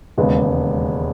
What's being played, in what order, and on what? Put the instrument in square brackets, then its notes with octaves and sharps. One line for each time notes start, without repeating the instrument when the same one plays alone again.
[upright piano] E1 D#2 C#3 G#3 B3